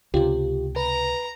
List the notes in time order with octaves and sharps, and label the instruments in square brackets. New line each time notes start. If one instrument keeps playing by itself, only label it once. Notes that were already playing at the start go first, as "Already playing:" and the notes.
[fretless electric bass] C#2 C3 [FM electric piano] F4 G4
[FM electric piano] B4 [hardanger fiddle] A#5